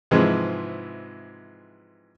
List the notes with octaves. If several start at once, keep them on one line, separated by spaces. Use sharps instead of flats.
G#2 C3 E3 F3 G#3